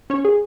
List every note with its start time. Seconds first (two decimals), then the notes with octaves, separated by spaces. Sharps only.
0.10 C#4 C#5
0.25 G#4